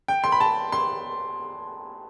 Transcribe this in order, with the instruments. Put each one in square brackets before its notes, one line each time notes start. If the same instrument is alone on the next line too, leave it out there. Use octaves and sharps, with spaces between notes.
[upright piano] G5
C6
B5
A5
C6